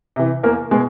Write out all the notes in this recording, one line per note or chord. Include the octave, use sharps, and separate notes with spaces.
C3 E3
E2 A#3 A#4
B2 G#3 G#4